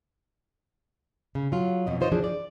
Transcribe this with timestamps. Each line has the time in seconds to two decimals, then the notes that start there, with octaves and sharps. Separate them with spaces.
1.35 C#3
1.52 F#3 F4
1.86 F2 B2 D#5
2.00 D#4 F4 C5 C#5 D#5
2.12 E3 F3 D4 G#4
2.24 D5